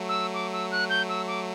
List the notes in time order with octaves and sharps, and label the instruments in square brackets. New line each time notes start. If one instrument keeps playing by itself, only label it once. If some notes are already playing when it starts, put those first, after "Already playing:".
Already playing: [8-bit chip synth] F#3 A3
[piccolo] E6
D6
E6
F#6
G6
E6
D6